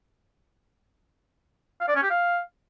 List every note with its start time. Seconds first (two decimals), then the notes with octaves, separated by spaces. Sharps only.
1.81 F5
1.88 D5
1.95 C#4
2.03 G4
2.10 F5